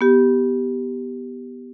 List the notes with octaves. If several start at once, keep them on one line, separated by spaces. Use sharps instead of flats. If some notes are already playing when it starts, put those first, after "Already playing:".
B3 G4